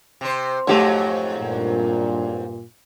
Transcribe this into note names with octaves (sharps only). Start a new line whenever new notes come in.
C3 C5
F2 G#2 F#3 A3 G4 C#5
G2 A#2